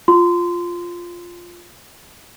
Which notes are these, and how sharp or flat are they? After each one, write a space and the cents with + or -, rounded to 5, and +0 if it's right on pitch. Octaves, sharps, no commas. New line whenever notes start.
F4 +0 C6 -20